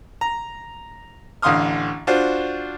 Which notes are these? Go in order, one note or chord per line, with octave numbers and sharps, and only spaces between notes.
A#5
A1 D3 F5 C6 D#6 F6
D4 F4 F#4 C5